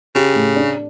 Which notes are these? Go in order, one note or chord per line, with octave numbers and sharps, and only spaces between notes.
C#3 G4
A2
D4